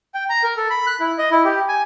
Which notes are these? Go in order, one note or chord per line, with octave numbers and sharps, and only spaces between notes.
G5
A#5
A#4
A4
B5
F#6
E4
D#5
E4
G4
G#5